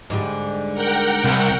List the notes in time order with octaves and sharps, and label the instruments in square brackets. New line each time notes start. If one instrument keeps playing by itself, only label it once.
[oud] G#2 D3 G3
[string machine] A#4 F#5 G5
[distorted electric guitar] C2